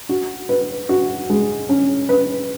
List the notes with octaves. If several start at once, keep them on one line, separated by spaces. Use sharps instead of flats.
F#4
B4
F#4
G#3
C#4
B4